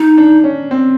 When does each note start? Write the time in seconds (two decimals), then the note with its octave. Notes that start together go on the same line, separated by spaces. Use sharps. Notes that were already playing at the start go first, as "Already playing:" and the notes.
Already playing: D#4
0.17 D4
0.44 C#4
0.71 C4